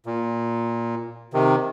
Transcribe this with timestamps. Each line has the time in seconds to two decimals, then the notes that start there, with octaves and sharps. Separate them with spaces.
0.06 A#2
1.33 C3 D#3